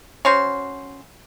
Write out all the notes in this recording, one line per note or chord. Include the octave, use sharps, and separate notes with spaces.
C#4 F#4 C5